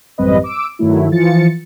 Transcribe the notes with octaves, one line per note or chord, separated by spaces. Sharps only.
A1 F#2 G3 C4 B4 D#5
D6 E6 D7
G2 D#3 F#3 A3 E4
E3 F3 F4 A6 C#7